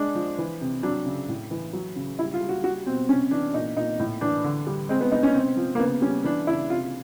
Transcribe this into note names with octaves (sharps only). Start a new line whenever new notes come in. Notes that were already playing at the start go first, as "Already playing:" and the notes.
Already playing: G#3 D4
F3
E3
C3
F#3 D4
C#3
A2
E3
F#3
C#3
G3 E4
F4
G3
F#4
G3 F#4
B2 C4
C3 C#4
E3 D4
A#2 D#4
A#2 D#4
A2
E3 D4
D3
G3
G#3 C4
B3
G#3 D#4
C#4
C3 C4
F3
A#3
C#3 B3
G3 C#4
E3 D4
C#3 E4
C3 F4